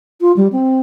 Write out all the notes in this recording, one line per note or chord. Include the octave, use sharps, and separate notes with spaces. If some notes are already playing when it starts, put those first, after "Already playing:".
F4
G3
C4